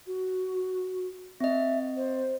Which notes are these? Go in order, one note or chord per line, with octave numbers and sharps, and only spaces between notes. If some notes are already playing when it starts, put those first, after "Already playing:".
F#4
C4 D#5 E5
C5